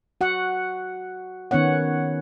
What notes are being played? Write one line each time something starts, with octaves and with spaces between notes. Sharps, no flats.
F#4 F#5
D#3 B3 C#4 C#5 F#5